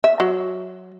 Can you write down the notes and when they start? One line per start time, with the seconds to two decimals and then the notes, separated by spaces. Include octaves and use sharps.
0.04 E5
0.20 F#3